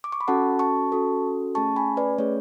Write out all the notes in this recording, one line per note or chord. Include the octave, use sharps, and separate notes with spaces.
D6
C#6
B5
C#4 F#4 A4 F#5 A5
A5 C#6
C#4 F#4 A4
A3 C#4 G#4 A5 C#6
G#5 B5
B4 D5
A3 C#4 G#4 C#5